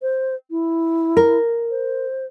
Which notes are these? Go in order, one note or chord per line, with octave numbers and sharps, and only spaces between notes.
C5
E4
A#4
C5